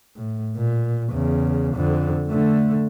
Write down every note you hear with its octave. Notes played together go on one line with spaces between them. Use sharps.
A2
A#2
E2 C#3
F2 D3
D3 A3